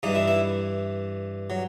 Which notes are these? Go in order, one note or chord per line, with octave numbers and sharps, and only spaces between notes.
G2 E3 D#4
E4
E4
F#3